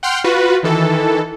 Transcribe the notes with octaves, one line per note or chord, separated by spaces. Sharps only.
F#5 G5 C6 F6 G6
F4 F#4 B4
D#3 E3 A4